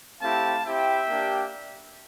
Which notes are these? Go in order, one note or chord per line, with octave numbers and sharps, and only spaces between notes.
A3 C4 E4 G4 F5 A5
C4 E4 G4 E5 G5
A#3 D4 G4